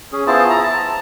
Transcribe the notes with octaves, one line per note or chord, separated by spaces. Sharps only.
C#4 G#4
B3 E4 F4 G#4 C5 A5
E4 A#5
A5